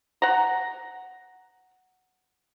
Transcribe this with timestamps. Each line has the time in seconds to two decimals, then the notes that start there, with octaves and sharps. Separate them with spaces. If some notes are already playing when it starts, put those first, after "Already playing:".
0.22 F#5 A#5